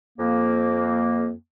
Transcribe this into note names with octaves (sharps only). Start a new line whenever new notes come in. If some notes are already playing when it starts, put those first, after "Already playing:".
F2 A#3